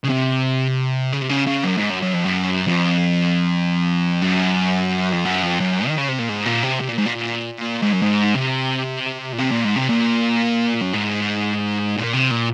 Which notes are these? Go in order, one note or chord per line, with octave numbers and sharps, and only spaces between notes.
C#3
C3
C#3
C3
C#3
C#3
F#2
G#2
F#2
F#2
F2
F#2
F2
F#2
F2
F#2
F2
F#2
D#3
C#3
C3
A#2
G#2
A#2
C3
C3
A#2
G#2
A#2
G#2
F#2
G#2
C3
A#2
C3
A#2
G#2
C3
A#2
F#2
G#2
A#2
C3
A#2